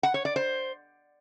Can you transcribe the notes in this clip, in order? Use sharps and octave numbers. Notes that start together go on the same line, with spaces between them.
F#5
C#5
D5
C5